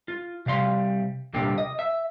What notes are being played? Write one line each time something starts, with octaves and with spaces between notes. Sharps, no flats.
F4
C3 G3 F5 C6
C2 A#2 D3 A#3 G4
D#5
E5